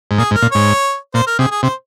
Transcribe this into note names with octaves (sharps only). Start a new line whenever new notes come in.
G#2
A#2 G#4
G#2
A#4
A#2
G#2 C#5
A#2 C5
A#4
C3 G#4
G#4
C3 C5